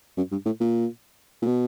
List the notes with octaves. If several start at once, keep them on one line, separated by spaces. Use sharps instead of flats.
F#2
G2
A2
A#2
A#2
B2